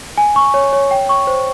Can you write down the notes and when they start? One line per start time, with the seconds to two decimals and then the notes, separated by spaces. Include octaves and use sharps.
0.18 G#5
0.36 C#6
0.54 C#5
0.73 C#5
0.91 G5
1.09 C#6
1.27 C5